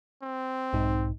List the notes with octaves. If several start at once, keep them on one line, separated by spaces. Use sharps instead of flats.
C4
B1 G#2 D#4